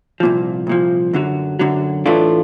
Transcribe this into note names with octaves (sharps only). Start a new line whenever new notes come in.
C2 A#2 F3
C2 A#2 F3
F#2 D3 F#3
F#2 D3 F#3
A2 E3 A3 D4 F4